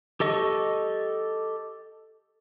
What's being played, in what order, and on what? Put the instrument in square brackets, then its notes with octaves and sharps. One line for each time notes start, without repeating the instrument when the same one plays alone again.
[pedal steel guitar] G4 A4 D#5 C#6